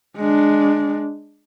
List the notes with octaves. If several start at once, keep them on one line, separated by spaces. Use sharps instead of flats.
G#3 D4